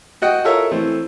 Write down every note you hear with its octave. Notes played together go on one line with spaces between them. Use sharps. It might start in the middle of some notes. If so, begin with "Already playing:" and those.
F#4 D#5 F#5 G5
F4 A4 A#4 C#5 E5
E3 A3 C4